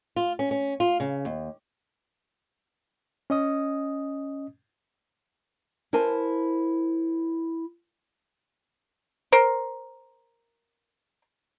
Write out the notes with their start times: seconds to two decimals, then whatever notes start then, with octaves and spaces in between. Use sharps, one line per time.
0.16 F4
0.39 C#4
0.51 C#4
0.80 F4
1.00 C#3
1.25 D#2
3.30 C#4 D#5 D#6
5.93 E4 A#4 C5 G#5 A5
9.32 A#4 C5